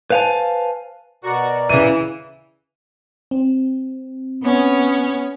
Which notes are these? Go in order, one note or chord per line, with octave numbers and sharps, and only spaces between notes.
B4 C5 F5 F#5 G#5 A5
B2 F#4 A#4 D5
C#3 E3 D#7
C4
B3 C#4 C#5